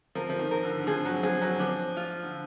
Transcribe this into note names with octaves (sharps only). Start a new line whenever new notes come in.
F3 A#4
F3
D#3
A#4
D3
D3
F3 G#4
F#3
F3 G#4
F#3
F3 D4
F4
D3